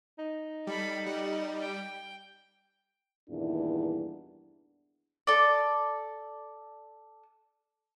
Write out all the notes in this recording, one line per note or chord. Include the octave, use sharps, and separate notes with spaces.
D#4
G3 A4 B5
G3 F#5
G5
E2 G2 A#2 D#3 D4 E4
A4 D5